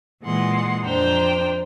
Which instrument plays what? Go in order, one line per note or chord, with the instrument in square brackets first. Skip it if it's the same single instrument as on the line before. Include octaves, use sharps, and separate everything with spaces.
[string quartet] A#2 E3 G#3 F#5 C6
F2 D4 C5 G5 A#5